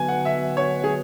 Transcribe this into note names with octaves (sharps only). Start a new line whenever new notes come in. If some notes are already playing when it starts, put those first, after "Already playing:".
Already playing: D3 F#3 B3 F#4 B4 G#5
F#5
E5
C#5
G#4